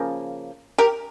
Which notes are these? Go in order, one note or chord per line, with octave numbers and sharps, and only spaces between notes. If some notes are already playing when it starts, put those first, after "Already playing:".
Already playing: C#3 F3 A#3
G4 A#4